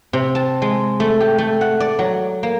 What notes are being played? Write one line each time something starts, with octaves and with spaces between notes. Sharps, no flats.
C3
A5
G#3
A3
G4
A3
F#5
D5
F#3
A#3